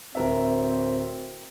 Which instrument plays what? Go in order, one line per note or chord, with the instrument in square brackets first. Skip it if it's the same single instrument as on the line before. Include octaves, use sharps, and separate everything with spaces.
[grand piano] D1 A#4 E5 [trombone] C4